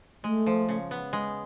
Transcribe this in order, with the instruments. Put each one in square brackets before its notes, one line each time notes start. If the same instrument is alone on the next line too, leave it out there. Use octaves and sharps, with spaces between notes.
[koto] G#3 [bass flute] A3
[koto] F3
C#3
B3
G#3